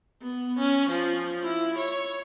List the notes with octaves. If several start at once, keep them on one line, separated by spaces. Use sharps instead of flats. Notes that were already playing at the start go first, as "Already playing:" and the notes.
B3
C#4
F3
E4
C#5